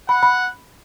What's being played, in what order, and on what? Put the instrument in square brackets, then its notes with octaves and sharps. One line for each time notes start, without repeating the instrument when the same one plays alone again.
[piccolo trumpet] F#5 [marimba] B5
[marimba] B5